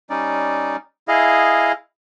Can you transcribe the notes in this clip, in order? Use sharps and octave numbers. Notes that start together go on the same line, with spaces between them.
G3 C#4 D#4 D5
E4 G#4 D#5 F5